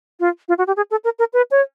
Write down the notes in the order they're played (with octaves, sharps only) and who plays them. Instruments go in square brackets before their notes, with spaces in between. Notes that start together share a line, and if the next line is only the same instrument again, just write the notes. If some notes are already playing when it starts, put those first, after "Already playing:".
[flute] F4
F4
F#4
G4
G#4
A4
A#4
A#4
B4
C#5